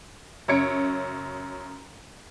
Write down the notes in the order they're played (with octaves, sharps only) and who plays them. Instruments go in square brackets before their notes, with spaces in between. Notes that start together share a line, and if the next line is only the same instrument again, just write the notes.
[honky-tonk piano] F#2 C#3 C#5 G#6 C#7 D7